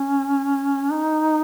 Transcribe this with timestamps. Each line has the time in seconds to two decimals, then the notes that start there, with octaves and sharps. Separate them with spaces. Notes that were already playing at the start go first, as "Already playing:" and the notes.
Already playing: C#4
0.92 D#4